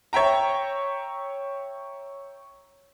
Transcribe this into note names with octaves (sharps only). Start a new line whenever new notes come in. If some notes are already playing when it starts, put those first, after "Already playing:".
C#5 E5 G5 A#5